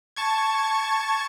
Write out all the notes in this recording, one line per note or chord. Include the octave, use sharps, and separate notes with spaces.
A5 C#6 G#6